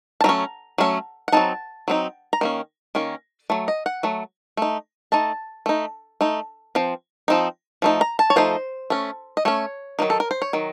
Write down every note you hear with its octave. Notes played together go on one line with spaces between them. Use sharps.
A5
F#3 A3 C#4 A#5
F#3 A3 C#4
F#5
F#3 C4 D#4 A5
F#3 C4 D#4
A#5
D#3 A#3 C#4
D#3 A#3 C#4
F#3 A3
D#5
F#5
F#3 A3
A3 D#4
A3 D#4 A5
A3 D#4
A3 D#4
F3 C4
F3 C4 D#4
F3 A3 D#4
A#5
A5
C#5
F3 A3 D#4 C5
A3 C#4
D#5
A3 C#4 C#5
D#3 F#3 A#3 D#4
A4
A#4
C5
C#5
D#3 F#3